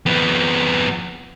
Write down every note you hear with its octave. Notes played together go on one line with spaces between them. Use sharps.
F2 B3